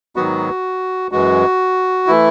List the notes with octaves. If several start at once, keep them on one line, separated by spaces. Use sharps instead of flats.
G#2 D#3 F#3 B3 F#4
F#2 E3 G#3 F#4
E3 A3 E4